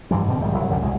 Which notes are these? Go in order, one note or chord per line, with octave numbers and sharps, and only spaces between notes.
G2 E3 F3 G3
G#2 B2 D3 C4
A#1 G#2 D#3 G3
C2 C#3 F#3
C2 F#2 D3 G3
C2 B2 G#3